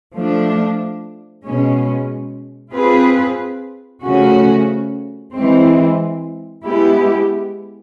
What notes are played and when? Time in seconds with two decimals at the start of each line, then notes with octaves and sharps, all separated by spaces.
0.15 F3 A3 D4
1.44 B2 G#3 C#4
2.74 C4 F4 G#4 B4
4.03 C#3 F3 A3 C#4 F#4
5.33 E3 G#3 C4
6.64 G#3 B3 E4 G4